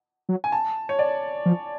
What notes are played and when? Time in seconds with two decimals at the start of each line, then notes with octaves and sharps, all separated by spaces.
0.29 F#3
0.44 G#5
0.52 A5
0.89 C#5
0.99 D5
1.46 F3